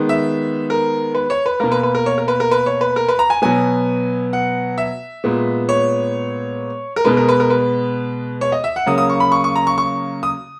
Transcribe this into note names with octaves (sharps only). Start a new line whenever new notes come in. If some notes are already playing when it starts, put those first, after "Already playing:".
Already playing: D#3 G#3 B3
E5
A#4
B4
C#5
B4
B2 A#3 A#4
B4
B4
A#4
C#5
A#4
B4
A#4
B4
C#5
B4
A#4
B4
A#5
G#5
B2 F#3 B3 G#5
F#5
E5
A#2 G#3 B3
C#5
A#4
B2 G#3 B3 B4
A#4
B4
A#4
B4
C#5
D#5
E5
F#5
C#3 F#3 A#3 D#6
D#6
C#6
B5
C#6
C#6
A#5
C#6
C#6
D#6